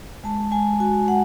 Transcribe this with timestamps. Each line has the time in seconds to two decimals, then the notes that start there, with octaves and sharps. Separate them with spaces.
0.24 G#3 A5
0.52 G#3 G#5
0.80 F#4 G#5
1.08 G#3 F#5